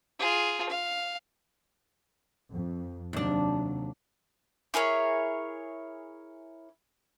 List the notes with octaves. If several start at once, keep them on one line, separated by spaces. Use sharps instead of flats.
F4 G#4
F5
F2
D#2 C3 F#3 D4
E4 G#4 A#4 C#5